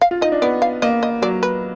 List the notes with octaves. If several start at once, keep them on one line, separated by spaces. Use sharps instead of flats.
F5
F4
D#4 D#5
D4
B3 D5
F5
A#3 D#5
D#5
F#3 D5
B4